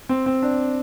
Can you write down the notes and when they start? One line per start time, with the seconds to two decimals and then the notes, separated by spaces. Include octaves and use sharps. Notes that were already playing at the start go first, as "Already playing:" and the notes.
0.09 C4
0.26 C4
0.42 D4